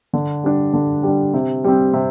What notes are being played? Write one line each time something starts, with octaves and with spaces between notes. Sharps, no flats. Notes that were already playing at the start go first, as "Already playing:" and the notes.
D3
G3 D4
D3
G3 D4
C3
G3 C4
C3